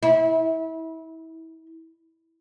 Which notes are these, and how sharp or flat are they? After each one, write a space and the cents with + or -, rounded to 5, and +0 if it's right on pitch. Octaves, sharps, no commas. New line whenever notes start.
E4 -30